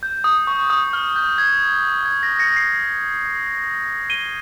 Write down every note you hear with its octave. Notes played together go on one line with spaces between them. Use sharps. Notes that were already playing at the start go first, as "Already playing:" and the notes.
G6
D#6
C#6
D#6
F6
G6
G#6
G#6
A#6
A#6 C#7
C7
D#7 G7